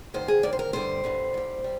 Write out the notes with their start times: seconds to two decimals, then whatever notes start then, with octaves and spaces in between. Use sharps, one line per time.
0.14 D2 C3 D#3 C5
0.28 G#4
0.43 D2 C3 D#3 D5
0.53 C5
0.59 A#4
0.73 G2 D3 G3 C5
1.04 G2 D3 G3
1.34 G#2 G3
1.64 G3